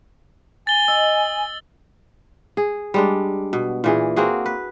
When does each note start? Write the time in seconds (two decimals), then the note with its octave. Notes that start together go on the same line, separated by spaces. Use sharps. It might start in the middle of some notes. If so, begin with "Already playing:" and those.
0.67 G#5 A6 G7
0.88 D#5 E6
2.57 G#4
2.94 G3 G#3 D4
3.53 B2
3.84 A#2 E3 G#4
4.16 A#3 C4 F#4 G#4
4.46 B4